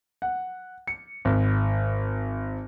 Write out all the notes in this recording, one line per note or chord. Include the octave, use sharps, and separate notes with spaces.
F#5
C#7
G#1